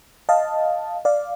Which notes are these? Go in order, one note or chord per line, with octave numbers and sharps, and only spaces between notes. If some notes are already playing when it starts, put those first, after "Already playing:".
D#5 F5 A5
D5 F5